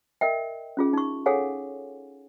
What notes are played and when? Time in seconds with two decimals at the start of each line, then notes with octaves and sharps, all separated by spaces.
0.21 A#4 D#5 E5 G5
0.77 C#4 F4 G#4
0.93 D#4 C#6
1.26 G#4 A4 C#5 F5 F#5 G#5